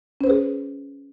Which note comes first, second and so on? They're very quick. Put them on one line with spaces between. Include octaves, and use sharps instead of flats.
C#4 C5 B4 G#4